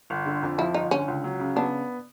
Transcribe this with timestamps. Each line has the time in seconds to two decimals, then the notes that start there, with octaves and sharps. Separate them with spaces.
0.10 G1
0.26 D3
0.43 F2
0.58 F3 E4
0.74 G1 D#4
0.91 D3 C#4
1.08 C#2
1.24 F#3
1.40 C#3
1.56 B3 D4